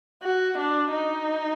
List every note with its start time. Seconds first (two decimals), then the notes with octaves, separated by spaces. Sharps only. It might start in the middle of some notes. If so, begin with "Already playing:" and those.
0.23 F#4
0.58 D4
0.91 D#4